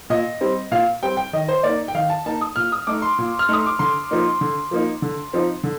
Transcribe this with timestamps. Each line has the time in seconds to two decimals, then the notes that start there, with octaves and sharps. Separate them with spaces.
0.10 A#2 D#5
0.41 G3 C4
0.71 A#2 F5
1.03 G3 C4 G5
1.17 G5
1.33 D#3 D#5
1.48 C5
1.63 A#3 D#4 D5
1.88 G5
1.95 D#3 F5
2.09 A5
2.26 A#3 D#4 A5
2.41 D#6
2.56 A#2 F6
2.72 D#6
2.87 A3 D#4 D6
3.02 C6
3.18 A#2
3.39 F6
3.48 A3 D#4 D#6
3.66 D6
3.79 D3 C6
4.11 F3 A#3 D#4
4.41 D3
4.71 F3 A#3 D#4
5.02 D3
5.33 F3 C4 D#4
5.64 D3